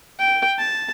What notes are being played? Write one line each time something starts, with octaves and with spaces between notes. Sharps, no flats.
G5
A5